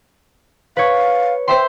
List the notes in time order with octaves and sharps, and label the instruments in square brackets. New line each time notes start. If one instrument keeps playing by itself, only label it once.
[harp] B4 C#5 [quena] F5
[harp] C5 E5 C6 [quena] G5